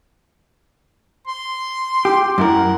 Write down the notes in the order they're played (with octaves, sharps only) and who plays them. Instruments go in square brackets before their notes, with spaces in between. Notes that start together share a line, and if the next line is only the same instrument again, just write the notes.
[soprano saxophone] C6
[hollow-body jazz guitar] G4
[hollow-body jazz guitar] F#2 E4 A#4 [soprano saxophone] F#5